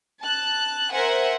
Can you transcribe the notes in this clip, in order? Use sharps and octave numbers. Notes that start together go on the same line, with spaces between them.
A5 F#6
A#4 C5 E5 F#5 G#5